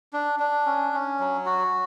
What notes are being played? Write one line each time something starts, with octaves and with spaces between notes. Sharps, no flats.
D4
D4
C#4
C#4
F#3
F#4